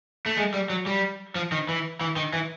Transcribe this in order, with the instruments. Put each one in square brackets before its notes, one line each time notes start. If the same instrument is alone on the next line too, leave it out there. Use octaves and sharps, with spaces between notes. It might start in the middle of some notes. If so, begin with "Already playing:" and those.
[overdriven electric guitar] A3
G#3
G3
F#3
G3
F3
D#3
E3
E3
D#3
E3